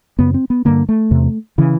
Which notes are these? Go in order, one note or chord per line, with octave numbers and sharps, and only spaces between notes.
F#2 C#3 B3
C4
B3
G2 D3 A#3
A3
E2 C3
C#3 E3